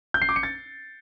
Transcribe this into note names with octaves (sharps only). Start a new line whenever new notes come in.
G6
C7
D6
C#7
A6